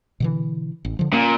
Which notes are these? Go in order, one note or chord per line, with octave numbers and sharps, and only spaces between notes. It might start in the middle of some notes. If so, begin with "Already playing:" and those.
B2 D3 E3
A1
D3 F3
A#2 A#3 C#4